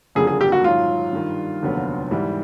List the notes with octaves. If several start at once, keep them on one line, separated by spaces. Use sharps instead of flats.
F#1 F2 D3 G3 A#3 G#4
G#4
G4
F#4
G#2 D#3 F#3 F4
G2 D#3 G3
F1 D#2 D3 F#3 B3
G#2 E3 G3